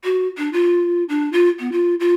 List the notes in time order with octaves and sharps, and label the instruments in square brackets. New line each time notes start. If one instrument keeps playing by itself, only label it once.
[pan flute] F#4
D4
F4
D4
F4
B3
F4
F4